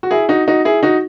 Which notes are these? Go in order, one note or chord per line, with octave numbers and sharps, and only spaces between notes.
F#4
E4 G#4
D#4 F#4
D#4 F#4
E4 G#4
D#4 F#4